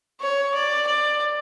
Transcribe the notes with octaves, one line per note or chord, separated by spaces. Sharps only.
C#5
D5
D5